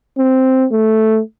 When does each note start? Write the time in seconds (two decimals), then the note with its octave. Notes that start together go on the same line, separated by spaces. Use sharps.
0.18 C4
0.72 A3